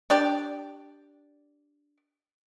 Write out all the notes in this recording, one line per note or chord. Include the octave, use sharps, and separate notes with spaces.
D4 G4 D5